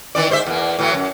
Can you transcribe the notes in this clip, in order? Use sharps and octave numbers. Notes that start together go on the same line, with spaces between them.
D#3 E3 D5
G#2 C5 E5
E2 A#3
A2 E3 F#3
F#2